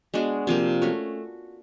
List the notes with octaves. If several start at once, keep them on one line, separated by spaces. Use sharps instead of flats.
G#3 B3 D4 F#4
C3 F3 A#3
A3 C#4 F#4